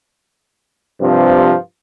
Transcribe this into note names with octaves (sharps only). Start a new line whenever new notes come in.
G2 C3 F3